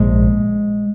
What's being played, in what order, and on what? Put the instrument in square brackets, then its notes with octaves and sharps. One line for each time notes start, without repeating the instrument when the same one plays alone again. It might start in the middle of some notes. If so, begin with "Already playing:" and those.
Already playing: [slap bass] A#1 G#2 G#3